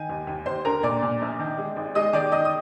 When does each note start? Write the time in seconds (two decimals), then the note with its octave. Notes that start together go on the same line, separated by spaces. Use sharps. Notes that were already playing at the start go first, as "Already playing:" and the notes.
Already playing: D#3 G#5
0.09 D#2
0.27 D#2
0.46 D#2 C5 C6
0.65 D3 A#4 A#5
0.83 A#2 D5 D6
1.02 A#2
1.21 A#1
1.39 D#3
1.58 G#3
1.76 G#1
1.95 G#3 D#5 D#6
2.13 D#3 D5 D6
2.32 D#3 D#5 D#6
2.45 D#6